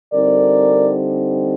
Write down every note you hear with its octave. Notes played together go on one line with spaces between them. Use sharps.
D3 G3 C4 D#4 A#4 D5